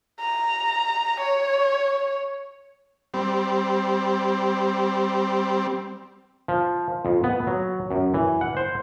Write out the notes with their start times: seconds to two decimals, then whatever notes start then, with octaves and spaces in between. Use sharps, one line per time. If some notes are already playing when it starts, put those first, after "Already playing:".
0.21 A#5
1.21 C#5
3.14 G3 C4
6.48 F3
7.05 F2
7.24 B3
7.47 F#3
7.91 F#2
8.14 E3
8.41 F#5
8.57 C5